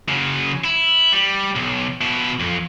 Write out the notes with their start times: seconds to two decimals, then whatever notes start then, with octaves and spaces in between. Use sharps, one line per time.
0.09 C#3 F#3
0.64 E4
1.12 G3
1.55 B1
2.01 B2 E4
2.40 F2